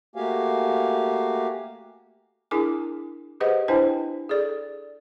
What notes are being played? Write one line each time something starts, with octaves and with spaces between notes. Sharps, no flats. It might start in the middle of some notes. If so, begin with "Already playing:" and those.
A3 A#3 F#4 G4 F5 G#5
D4 E4 G#4 A#4 G#5 D6
G4 G#4 B4 C5 D#5 F#5
D4 E4 B4 C5 G5 G#5
G#4 A4 D5